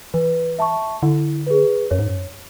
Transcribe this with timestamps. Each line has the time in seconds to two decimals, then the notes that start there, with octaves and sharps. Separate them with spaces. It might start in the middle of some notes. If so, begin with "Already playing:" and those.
0.14 E3 B4
0.59 E5 A5 C#6
1.02 D3 E4
1.47 G#4 B4
1.91 F#2 C#5
1.99 G#2
2.07 F#2